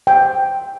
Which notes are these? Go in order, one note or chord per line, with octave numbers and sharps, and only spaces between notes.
G5